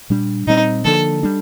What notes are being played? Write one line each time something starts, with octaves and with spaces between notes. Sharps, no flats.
A#2 G3 D4
A#2 G3 C4 D#4
D3 F3 A#3 D4 A4
G3 D4